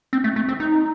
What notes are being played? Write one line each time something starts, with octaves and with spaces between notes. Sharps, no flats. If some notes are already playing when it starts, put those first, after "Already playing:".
C4
A3
A3
C4
D#4